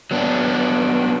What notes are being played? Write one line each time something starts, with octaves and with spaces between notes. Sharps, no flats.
F#3 B3 D4